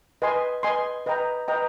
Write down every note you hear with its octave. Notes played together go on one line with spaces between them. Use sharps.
B4 D#5 G#5 C6
B4 D#5 G#5 C6
B4 D#5 G5 A#5
B4 D#5 G5 A#5